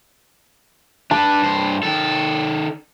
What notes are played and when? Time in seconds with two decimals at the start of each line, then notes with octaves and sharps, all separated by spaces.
1.11 D4 B4 A5
1.42 G2 C5
1.83 D#3 A4